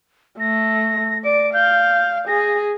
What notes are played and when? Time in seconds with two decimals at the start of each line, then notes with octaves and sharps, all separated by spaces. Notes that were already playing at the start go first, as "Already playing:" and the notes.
0.40 A3 A#6
1.24 D5 D7
1.54 F5 G6
2.28 G#4 A#6